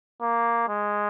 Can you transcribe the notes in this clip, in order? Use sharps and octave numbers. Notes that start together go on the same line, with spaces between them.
A#3
G#3